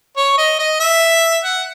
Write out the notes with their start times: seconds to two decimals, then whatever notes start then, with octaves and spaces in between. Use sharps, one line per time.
0.17 C#5
0.38 D#5
0.59 D#5
0.80 E5
1.44 F#5